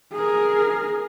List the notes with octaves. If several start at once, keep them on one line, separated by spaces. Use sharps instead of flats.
G#4 A#4